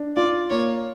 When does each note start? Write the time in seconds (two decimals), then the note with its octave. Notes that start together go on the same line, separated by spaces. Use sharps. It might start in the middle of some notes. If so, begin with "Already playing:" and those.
Already playing: D4
0.16 F4 D5
0.50 A#3 C#5